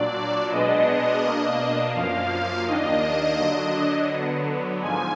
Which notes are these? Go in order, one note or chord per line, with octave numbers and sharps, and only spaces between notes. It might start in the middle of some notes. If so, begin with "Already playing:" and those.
Already playing: A#2 F#3 D4 D5
B2 G#3 B3 D4 D#5
B2 A#3 D4
F#2 F3 A#3 F5
D#2 D#3 A#3 D4 D#5
D3 F#3 D4
D3 F#3 B3
G#2 F3 G#5